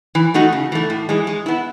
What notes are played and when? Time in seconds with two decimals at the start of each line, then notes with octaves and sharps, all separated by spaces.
0.15 E3
0.34 A3 D#4 F#4
0.52 C#3
0.72 E3 A3
0.90 A2
1.09 E3 G#3
1.27 G#3
1.46 B3 E4